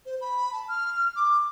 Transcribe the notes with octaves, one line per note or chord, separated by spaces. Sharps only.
C5
B5
A5
F6
D6